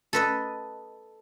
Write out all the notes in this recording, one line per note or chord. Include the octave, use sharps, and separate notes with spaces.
A4 B4 D#5